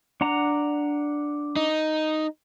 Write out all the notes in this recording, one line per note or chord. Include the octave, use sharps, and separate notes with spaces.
D4 F#5 A#5
D#4